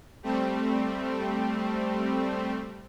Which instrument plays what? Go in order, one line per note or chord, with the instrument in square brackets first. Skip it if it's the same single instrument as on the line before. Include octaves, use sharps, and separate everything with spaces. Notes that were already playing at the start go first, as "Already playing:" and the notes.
[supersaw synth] G3 A3 C4